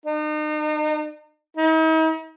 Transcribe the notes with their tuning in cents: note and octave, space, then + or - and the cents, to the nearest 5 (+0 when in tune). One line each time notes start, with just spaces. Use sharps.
D#4 -40
D#4 +45